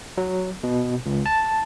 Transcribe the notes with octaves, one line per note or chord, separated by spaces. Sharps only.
F#3
B2
C#2
A5